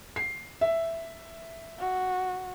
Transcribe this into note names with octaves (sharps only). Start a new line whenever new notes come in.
C7
E5
F#4